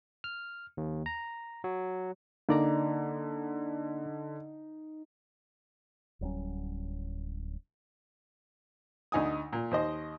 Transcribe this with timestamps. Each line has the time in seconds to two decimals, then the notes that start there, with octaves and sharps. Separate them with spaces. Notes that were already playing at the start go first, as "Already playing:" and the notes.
0.24 F6
0.77 D#2
1.06 A#5
1.64 F#3
2.49 D3 A#3 D#4 D5 A#5
6.21 D1 F#3 G3 C#4
9.12 D2 D#4 G#5 D#6
9.53 A#2
9.71 D#2 C5 D#5